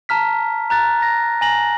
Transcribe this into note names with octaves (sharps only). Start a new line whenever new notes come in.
A5 A#5 F6 B6
A#5 F#6 A6
A#5 A#6
G#5 A#5 A#6 F#7